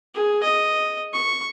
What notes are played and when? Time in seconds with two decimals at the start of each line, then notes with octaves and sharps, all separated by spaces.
0.15 G#4
0.43 D#5
1.13 C#6